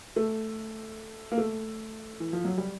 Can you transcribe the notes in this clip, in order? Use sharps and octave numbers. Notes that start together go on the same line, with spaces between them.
A3
A#3
A3
E3
F3
F#3
G3